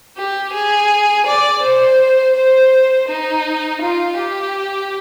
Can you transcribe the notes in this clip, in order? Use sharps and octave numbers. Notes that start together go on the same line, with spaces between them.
G4
G#4
D5
C5
C5
D#4
F4
G4